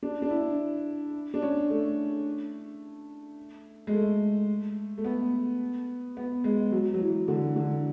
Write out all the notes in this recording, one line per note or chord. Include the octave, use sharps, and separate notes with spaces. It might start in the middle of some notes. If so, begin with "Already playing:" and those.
D4
D4
E4
D4
C#4
A3
G#3
A3
A3
B3
B3
G#3
F#3
F#3
E3
D3
D3